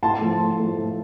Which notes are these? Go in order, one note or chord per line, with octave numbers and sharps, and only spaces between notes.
A2 A5 C6
F3 A3
A2
F3 A3
A2